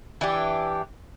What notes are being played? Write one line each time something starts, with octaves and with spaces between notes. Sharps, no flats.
E3 D4 G4